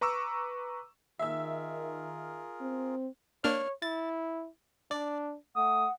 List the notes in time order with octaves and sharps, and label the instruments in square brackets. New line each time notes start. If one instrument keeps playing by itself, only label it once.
[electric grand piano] B4 A#5 C#6 D6 E6
[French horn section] D#3 [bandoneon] F4 G#4 A#4 [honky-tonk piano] E5 E6
[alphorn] C4
[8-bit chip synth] A#3 D4 F6 [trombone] C#5
[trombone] E4 [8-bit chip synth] A6
[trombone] D4 [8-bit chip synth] D5
[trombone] A3 [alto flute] F#5 [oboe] D#6